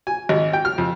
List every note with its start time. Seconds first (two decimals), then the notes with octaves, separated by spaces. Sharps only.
0.07 G#5
0.29 G#1
0.53 G5
0.65 F6
0.78 F2